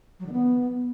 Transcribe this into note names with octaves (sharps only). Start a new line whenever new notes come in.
F#3
D3
B3